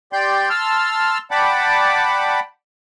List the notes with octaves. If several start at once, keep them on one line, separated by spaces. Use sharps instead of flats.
G4 D5 G5 C6 G6
A5 C6 E6 F6
D5 F#5 G5 A5 B5 D6